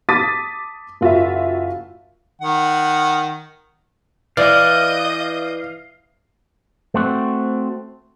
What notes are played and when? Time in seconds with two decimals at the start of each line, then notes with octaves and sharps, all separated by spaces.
0.09 A5 D6 D#6 A6 B6 D#7
1.01 F#1 F4 F#4 E5
2.41 D#3 F#5
4.37 E3 D5 D#5 F5 D#6 G6
6.94 A3 C4 F#4